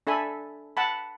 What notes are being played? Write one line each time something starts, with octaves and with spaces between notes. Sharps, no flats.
D4 A4 E5 G#5 B5
F#5 A5 B5